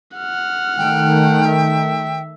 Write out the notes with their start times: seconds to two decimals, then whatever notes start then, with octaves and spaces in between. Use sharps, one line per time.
0.17 F#5 F6
0.78 D#3 A3 G5
1.49 E5